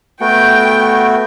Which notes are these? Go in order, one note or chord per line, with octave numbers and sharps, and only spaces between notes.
A3 B3 F#4 G5